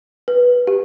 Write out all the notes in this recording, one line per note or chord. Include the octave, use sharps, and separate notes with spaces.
B4
G4